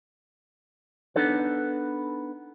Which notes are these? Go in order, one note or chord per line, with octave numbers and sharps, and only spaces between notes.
B3 D4 D#4 A4 B4